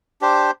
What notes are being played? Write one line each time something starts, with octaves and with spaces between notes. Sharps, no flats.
D4 G4 C5